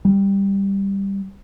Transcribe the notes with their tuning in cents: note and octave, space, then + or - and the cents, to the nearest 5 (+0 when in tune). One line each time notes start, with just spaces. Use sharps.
G3 +5